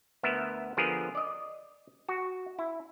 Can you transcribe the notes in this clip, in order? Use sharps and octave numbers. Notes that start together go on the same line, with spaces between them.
D2 B3 A#4 E5
D3 F3 B3 G#4 A#4
D5 D#5
F#4
E4